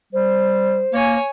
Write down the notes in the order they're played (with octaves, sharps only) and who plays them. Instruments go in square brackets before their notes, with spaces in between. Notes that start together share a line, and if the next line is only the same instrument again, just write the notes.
[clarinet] G3 [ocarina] C5
[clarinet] A#3 [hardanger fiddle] C#5 G#5